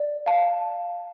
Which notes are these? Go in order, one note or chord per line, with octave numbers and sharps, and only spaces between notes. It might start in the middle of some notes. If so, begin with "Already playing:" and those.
Already playing: D5
F5 A5